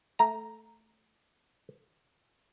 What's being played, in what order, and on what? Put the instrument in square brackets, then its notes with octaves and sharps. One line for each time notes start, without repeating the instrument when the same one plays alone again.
[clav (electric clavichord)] A3 A#5